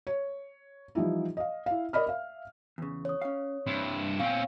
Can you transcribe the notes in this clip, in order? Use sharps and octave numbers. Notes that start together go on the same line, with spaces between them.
C#5
E3 F3 G3 D#4 E4
D#5 F5
E4 F5
A#4 D5 D#5 B5 F6
E5 F5
E2 C#3
C#5 D#6
C#4 F5
G2 C4 E4
A#2 C4 C#4 F5 G5